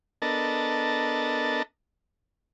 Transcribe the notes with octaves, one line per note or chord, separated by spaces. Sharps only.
B3 D4 A4 A#4 D#5 A5